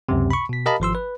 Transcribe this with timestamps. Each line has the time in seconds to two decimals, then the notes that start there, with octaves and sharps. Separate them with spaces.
0.09 C#2 F#2 C3
0.31 B5 C#6
0.49 B2 B6
0.66 G4 A#4 D#5 F5 A5 B5
0.80 G#1 F3 C6 E6
0.95 B4